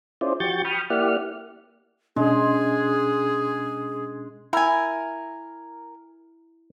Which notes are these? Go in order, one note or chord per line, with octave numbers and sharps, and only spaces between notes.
C#4 E4 F4 G#4 C5 D5
F3 F#4 G4 C#6 G6 A6
G5 B5 C#6 D#6 F6
A#3 E4 G4 D5 F#5 F6
B2 G#3 C#4 D4 G#4
E4 A#4 G#5